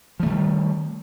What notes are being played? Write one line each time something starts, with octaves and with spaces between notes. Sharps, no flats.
D#3 F3 G3 A3